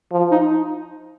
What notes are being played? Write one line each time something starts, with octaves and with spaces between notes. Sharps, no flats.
F3
D#4